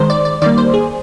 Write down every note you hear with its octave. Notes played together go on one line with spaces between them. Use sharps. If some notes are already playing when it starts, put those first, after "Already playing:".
Already playing: D#3 G#3 C5
D5
D5
D#3 G3 A#3 D5
C5
G#4